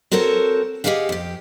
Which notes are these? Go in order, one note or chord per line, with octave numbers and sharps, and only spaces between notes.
C4 F#4 A4 A#4 C5 C#5
G4 G#4 B4 D#5 F5 F#5
F2 G4